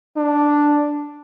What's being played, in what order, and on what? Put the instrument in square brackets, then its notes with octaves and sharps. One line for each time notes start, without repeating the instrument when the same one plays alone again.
[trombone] D4